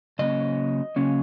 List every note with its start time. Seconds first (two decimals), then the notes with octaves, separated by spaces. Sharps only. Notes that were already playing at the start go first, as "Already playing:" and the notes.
0.19 C#3 F#3 A#3 C#4 D#5
0.96 C#3 F#3 A#3 C#4